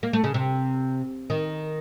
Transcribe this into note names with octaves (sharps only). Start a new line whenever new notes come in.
A#3
A3
C#3
C3
D#3